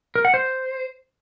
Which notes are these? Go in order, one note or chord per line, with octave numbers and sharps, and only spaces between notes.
A#4
F#5
C5